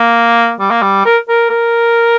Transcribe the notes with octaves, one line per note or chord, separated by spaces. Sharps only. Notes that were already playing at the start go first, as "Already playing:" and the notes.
Already playing: A#3
G3
A#3
G3
A#4
A#4
A#4